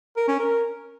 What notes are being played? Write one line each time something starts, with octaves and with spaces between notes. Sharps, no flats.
A#4
C#4
A#4